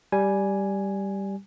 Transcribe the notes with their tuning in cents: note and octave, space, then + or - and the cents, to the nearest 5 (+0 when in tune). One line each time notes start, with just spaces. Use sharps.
G3 +0 G#5 +0